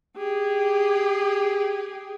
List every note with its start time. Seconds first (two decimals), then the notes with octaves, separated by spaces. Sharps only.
0.17 G4 G#4